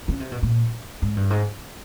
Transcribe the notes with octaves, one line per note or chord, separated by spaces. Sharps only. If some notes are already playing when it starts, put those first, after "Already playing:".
C#3
C3
B2
A#2
G#2
G2
G#2